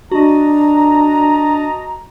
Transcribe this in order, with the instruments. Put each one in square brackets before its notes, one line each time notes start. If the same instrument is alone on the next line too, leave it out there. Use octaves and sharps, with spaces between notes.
[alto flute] D4 [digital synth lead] F#4 [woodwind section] D#5 A5 A#5